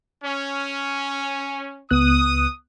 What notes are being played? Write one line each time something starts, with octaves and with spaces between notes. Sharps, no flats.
C#4
C#2 B3 D#6 F#6